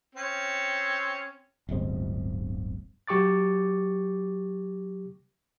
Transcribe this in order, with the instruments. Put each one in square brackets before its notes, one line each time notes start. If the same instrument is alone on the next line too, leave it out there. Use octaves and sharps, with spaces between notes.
[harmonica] C4 C#4
[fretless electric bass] D1 G1 G#3 C4
[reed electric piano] F#3 G4 C#6 D6 A6